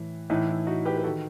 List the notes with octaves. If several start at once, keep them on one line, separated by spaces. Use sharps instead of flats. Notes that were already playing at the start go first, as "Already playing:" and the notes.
Already playing: A2 E3
A2 E3 D#4
E4
D#4 F#4
G4 B4
B4
F#4 A4
D#3